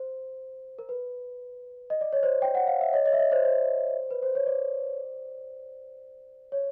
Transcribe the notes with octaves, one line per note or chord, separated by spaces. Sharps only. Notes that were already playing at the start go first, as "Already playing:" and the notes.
Already playing: C5
A#4
B4
D#5
D5
C#5
C5 D5
G5
F#5
F5
E5
C#5 D#5
C#5 D#5
E5
C#5 D#5
C5 D5
C5 D5
B4
C5
C#5
C5 D5
C#5